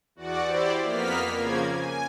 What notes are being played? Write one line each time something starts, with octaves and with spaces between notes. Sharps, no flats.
E2 F#4 D5 F#5
E4 G4 C5 D5
F2 A#3 B3 F6 B6
C#3 F3 A#3 G#6
G#5